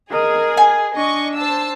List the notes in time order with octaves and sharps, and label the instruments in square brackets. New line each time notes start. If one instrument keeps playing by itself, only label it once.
[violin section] G#4 [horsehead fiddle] A#4 D#5
[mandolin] G#5
[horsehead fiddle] D4 [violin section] D#5 C#6
[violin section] C5 A5 E6